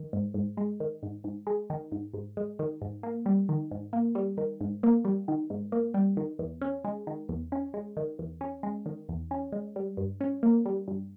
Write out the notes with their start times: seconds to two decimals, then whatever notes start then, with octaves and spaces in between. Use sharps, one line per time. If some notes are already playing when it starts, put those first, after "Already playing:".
Already playing: D#3
0.13 G#2
0.34 G#2
0.57 G#3
0.80 D#3
1.03 G#2
1.24 G#2
1.47 G#3
1.70 D#3
1.92 G#2
2.14 G#2
2.37 G#3
2.59 D#3
2.82 G#2
3.03 A#3
3.26 G3
3.49 D#3
3.71 G#2
3.93 A#3
4.15 G3
4.37 D#3
4.61 G#2
4.83 A#3
5.05 G3
5.28 D#3
5.50 G#2
5.72 A#3
5.94 G3
6.17 D#3
6.39 E2
6.61 C#4
6.84 G#3
7.07 D#3
7.29 E2
7.52 C#4
7.74 G#3
7.97 D#3
8.19 E2
8.41 C#4
8.63 G#3
8.86 D#3
9.09 E2
9.31 C#4
9.52 G#3
9.76 G3
9.97 G2
10.21 C#4
10.43 A#3
10.66 G3
10.88 G2